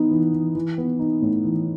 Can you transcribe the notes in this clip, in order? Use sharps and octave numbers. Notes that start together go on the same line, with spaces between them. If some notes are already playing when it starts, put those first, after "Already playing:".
Already playing: E3 B3 D#4
E3
E3
E3
B3
D#4
A2
E3